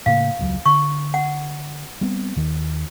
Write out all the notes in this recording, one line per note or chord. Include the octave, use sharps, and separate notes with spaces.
A2 C#3 A#3 F5
E1 C#2 F#3
D3 C#6
F#5
G3 B3 C4
D#2 D#3